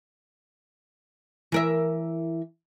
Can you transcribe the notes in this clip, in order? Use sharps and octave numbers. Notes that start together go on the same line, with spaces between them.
E3 A#4 E5